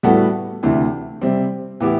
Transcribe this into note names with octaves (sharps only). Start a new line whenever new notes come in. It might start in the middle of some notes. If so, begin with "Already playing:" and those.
A2 G3 B3 F#4 A4
D2 C3 E3
C3 G3 C4
A2 E3 B3 E4 G4